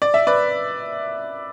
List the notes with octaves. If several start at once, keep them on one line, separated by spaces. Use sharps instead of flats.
D5
E5
B4 D5